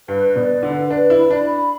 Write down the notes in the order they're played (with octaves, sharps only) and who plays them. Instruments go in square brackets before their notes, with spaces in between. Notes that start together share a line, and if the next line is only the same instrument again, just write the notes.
[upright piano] G2 [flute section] B4
[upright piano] B2 [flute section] D5
[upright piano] D3 [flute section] B4
[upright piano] D4 [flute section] B4
[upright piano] E4
[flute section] B5
[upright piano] D4
[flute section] B5